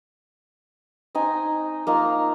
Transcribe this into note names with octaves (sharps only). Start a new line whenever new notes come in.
C4 D#4 G#5
A#3 D#4 F4